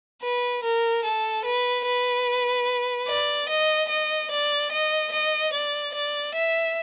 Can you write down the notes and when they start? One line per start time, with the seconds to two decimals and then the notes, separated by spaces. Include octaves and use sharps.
0.23 B4
0.64 A#4
1.05 A4
1.45 B4
1.86 B4
3.09 D5
3.49 D#5
3.90 D#5
4.31 D5
4.72 D#5
5.13 D#5
5.53 D5
5.94 D5
6.35 E5